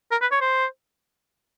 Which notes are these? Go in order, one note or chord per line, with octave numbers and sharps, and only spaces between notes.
A#4
B4
C#5
C5